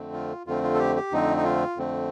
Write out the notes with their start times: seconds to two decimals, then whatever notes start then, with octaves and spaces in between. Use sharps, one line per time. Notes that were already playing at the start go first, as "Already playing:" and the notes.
Already playing: F2 D3 A3 C4
0.13 F4
0.46 F2 D3 A3 C4 F4
0.64 F4
0.74 A4
0.79 G4
0.96 G4
1.12 F2 D3 A3 C4 D#4
1.37 D#4
1.44 F4
1.77 F2 D3 A3 C4